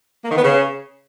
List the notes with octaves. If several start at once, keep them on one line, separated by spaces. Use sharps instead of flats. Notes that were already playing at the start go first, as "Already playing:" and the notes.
A#3
D#3
B3
C#3